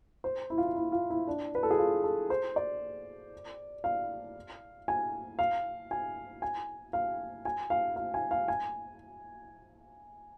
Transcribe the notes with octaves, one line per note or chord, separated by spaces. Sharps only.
C5
E4
F4
E4
E4
F4
E4
D4
B4
A4
G#4
F4
A4
C5
D5
F5
G#5
F5
G#5
G#5
F5
G#5
F5
F5
G#5
F5
G#5